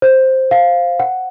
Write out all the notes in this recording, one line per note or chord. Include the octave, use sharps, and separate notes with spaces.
C5
F5
F#5